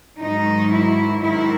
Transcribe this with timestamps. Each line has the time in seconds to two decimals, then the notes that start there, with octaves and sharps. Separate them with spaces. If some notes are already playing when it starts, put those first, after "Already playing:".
0.20 G#2 D#3 F#3 D#4
0.72 E4
1.23 G#2 D#3 F#3 E4